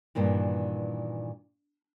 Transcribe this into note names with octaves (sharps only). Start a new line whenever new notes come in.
G2 A#2 D#3 E3